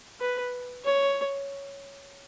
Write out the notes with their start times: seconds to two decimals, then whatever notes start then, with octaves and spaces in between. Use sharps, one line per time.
0.20 B4
0.84 C#5